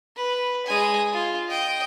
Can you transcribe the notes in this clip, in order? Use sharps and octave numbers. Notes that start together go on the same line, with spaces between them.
B4
G#3 G#5
F4
D#5 G5